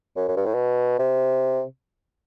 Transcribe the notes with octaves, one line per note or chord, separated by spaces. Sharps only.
F#2
F#2
G2
A2
B2
C3